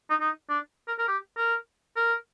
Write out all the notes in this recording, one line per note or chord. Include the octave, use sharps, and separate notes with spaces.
D#4
D#4
D4
A#4
A#4
G4
A#4
A#4